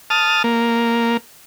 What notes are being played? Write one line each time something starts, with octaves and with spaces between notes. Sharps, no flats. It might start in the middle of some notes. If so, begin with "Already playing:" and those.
A5 D#6 F6
A#3